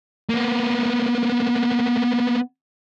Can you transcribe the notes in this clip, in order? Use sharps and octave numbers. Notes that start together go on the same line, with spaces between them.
A#3 B3